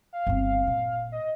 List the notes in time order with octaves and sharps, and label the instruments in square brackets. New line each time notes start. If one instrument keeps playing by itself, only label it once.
[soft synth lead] F5
[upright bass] G1 C4
A#2
[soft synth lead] D#5